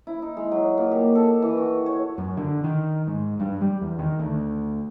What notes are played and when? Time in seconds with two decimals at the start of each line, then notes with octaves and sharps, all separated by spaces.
0.07 E4
0.22 D#4
0.37 G#3
0.52 F#3
0.78 A#2
0.91 G4
1.15 A4
1.42 E3
1.57 F#4
1.86 C#5
2.18 F#2
2.37 D3
2.64 D#3
3.07 G#2
3.40 G2
3.61 G3
3.81 E2
3.99 D#3
4.19 D2